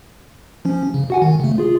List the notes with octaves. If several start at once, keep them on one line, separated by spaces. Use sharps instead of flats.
F3 C#4
C#3
F#4 F#5 G#5
D#3
C#3 A3
F4 G#4